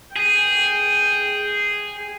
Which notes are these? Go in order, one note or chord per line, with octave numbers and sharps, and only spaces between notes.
G#4 G5